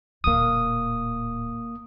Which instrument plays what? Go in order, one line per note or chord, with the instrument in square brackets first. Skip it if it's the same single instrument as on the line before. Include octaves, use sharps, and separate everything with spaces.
[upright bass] D1 A#2 [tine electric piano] A#3 D#6